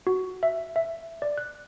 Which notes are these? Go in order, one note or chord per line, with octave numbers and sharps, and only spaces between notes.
F#4
E5
E5
D5
F#6